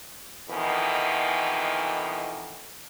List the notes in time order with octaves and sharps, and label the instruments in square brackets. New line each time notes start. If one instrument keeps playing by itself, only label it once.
[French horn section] F2 B2 D#3 E3